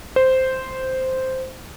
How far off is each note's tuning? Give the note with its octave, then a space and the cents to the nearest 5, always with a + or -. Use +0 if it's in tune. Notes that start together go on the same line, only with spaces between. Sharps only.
C5 -5